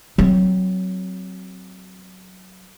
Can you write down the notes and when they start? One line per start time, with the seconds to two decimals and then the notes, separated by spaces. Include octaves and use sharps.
0.18 F#3 C4